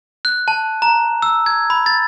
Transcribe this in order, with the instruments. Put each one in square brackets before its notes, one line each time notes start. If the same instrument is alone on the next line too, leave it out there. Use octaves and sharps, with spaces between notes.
[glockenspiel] F#6
A5
A#5
E6
G#6
B5
A6